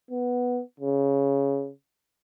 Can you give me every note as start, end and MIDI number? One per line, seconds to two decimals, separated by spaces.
0.11 0.60 59
0.80 1.69 49